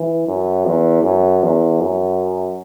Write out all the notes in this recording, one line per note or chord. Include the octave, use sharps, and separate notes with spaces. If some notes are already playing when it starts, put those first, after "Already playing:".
Already playing: E3
F#2
E2
F#2
E2
F#2